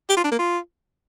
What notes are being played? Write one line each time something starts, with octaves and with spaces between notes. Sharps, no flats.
G4
F4
D4
A#3
F4